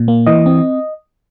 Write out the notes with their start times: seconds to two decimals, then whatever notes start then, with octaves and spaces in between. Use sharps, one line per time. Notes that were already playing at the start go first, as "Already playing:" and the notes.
Already playing: A#2
0.08 A#3
0.27 E3 D#5
0.46 C4